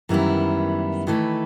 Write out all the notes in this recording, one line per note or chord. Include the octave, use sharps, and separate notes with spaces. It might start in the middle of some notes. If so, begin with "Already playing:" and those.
F#2 D#3 E3 G3 B3 E4
D#3 E3 A3 E4 B4